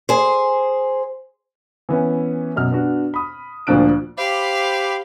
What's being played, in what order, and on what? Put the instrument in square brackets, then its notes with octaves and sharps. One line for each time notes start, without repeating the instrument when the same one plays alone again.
[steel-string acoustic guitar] G#4 C5
[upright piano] E3 B3 C#4
F#2 B2 F6
B3 D4 F#4
B5 D#6
D2 A#2 F3 D4 F#6 D7
[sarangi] G4 [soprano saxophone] C5 [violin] F5 [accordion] B5 D6